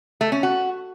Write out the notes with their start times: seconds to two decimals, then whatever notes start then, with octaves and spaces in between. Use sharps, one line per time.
0.21 A3
0.32 C#4
0.43 F#4